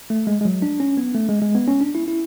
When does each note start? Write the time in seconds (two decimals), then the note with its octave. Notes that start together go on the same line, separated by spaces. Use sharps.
0.10 A3
0.27 G#3
0.41 G#3
0.45 F#3
0.62 D4
0.80 C#4
0.97 B3
1.15 A3
1.29 G#3
1.42 G#3
1.55 B3
1.68 C#4
1.81 D4
1.95 E4
2.08 E4